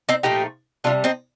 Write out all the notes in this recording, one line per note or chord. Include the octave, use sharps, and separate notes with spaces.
C4 D#4
A#2 F3 A3 D#4 G4
C3 G3 D4 F4
C4 D#4